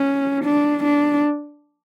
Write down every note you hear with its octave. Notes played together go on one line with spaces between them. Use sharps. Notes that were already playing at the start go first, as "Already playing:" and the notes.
Already playing: C#4
D4
D4